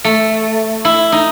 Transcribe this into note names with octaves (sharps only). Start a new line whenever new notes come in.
A3
E4
D#4